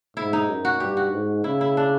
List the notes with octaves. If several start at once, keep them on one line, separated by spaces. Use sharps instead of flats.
G#2 E4
D#4
F#2
F#4
G2 G4
F#4
G#2
C#3 E4
E4
D4